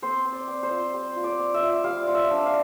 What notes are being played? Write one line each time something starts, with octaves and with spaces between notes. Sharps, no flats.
C4 C5
C4
D5
C4
C5
F4
G3 C5
F4
D5
C4
E5
F4
G3 F5
F4
E5
D4
F5